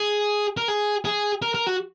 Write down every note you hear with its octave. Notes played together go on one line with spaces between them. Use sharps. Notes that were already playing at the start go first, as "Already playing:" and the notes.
Already playing: G#4
A#4
G#4
G#4
A#4
A#4
F#4